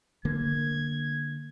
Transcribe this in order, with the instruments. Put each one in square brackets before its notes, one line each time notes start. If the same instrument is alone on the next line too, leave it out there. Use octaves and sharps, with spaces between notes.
[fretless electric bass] D3 A#3 [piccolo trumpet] G#6